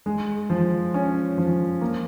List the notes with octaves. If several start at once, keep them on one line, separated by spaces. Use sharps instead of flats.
G#3
F3
C#4
F3
A#3